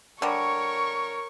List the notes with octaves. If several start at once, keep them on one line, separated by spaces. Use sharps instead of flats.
D3 G3 A#4 C#5 C#6